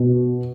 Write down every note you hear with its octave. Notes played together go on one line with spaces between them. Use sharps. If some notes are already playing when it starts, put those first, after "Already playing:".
Already playing: B2